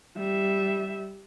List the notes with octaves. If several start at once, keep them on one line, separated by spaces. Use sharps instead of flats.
G3 E5